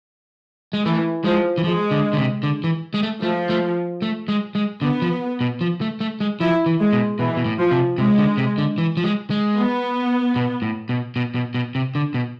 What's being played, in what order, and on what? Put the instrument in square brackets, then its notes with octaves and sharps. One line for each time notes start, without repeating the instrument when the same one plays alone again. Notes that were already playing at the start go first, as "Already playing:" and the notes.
[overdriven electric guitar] G#3
[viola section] E3 [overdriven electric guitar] A3
[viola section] F3 [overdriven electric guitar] G#3
[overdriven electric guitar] E3
[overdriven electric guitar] F3 [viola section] G#3
[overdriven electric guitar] D3
D3
C3
D3
E3
G#3
A3
[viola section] F3 [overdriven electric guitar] A3
[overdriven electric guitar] A3
A3
G#3
G#3
[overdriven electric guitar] D3 [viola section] B3
[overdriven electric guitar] F3
B2
F3
A3
A3
G#3
[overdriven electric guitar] F3 [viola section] E4
[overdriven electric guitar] E3
[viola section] G#3
[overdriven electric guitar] B2
[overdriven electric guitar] B2 [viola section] E3
[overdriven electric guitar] B2
A2
[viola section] F3
[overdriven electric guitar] C3
[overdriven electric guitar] C3 [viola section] G#3
[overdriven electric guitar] D3
C3
D3
E3
F3
G#3
G#3
[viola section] B3
[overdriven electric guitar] B2
A2
B2
B2
B2
B2
C3
D3
B2